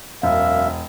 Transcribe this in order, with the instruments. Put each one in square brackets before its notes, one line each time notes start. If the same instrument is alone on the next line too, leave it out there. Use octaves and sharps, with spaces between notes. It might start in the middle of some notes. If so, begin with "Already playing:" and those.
[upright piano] E1 [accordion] F#2 E5 [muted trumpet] F5